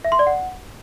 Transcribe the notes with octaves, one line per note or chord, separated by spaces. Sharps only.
E5
C6
D5
F#5